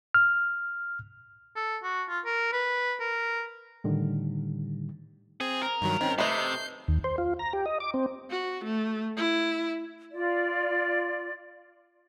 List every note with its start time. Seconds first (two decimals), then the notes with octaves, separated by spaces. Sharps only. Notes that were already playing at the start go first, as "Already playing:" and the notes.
0.15 F6
1.56 A4
1.83 F#4
2.09 F4
2.26 A#4
2.53 B4
3.00 A#4
3.84 A2 D3 D#3 G3
5.40 C4 G#4
5.62 A#4
5.81 G2 D#3 F#3
6.01 D#3 C4 C#4
6.18 C3 A3 B4 D#5 G6 C7
6.88 D#2
7.04 C5
7.18 F4
7.39 A#5
7.53 G4
7.66 D#5
7.80 D6
7.94 C4
8.30 F#4
8.64 A3
9.17 E4
10.11 F4 D5